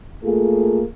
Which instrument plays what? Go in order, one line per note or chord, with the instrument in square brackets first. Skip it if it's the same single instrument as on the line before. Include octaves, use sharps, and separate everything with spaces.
[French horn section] A3 A#3 F4 G#4 A4